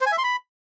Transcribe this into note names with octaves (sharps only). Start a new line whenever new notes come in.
C5
G#5
E5
C6
B5